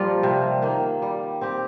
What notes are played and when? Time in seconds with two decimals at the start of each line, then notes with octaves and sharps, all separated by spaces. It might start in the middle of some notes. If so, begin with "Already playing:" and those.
Already playing: A#2 F3 G3 A#3 F4
0.23 C3
0.62 D#3 A#3
1.02 G3
1.41 C4 G4